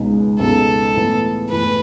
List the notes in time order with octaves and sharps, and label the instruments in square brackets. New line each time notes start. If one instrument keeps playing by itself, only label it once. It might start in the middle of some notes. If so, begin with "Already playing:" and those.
Already playing: [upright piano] C#2 B2 G#3 B3 D#4
[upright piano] C#2 B2 G#3 B3 D#4 [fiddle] A4
[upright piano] A2 E3 B3
[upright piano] A2 E3 B3 [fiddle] B4